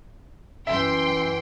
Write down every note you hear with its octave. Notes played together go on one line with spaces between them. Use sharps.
F#2 E3 E5 G5 C6